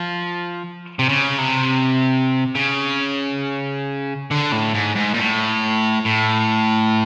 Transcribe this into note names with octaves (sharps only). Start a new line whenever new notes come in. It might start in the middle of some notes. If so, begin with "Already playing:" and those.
Already playing: F3
C3
C#3
C3
C#3
D3
A2
G#2
G#2
A#2
A2
A2